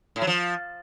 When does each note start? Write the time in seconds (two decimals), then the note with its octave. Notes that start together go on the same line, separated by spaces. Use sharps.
0.16 A2
0.22 F#3
0.27 F3